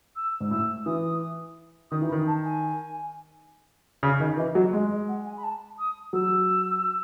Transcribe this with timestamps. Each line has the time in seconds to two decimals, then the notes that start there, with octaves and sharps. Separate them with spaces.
0.16 E6
0.40 G#2
0.51 A2 E6
0.86 E3 D#6
1.91 D#3 D#6
2.02 E3
2.09 B5
2.12 D#3
2.27 A5
2.45 G#5
4.03 C#3
4.20 D#3 D#5
4.37 E3 D#5
4.55 F#3 D#5
4.73 G#3 D#5
4.91 D#5
5.08 F#5
5.26 G#5
5.37 B5
5.44 A5
5.79 D#6
6.13 F#3 E6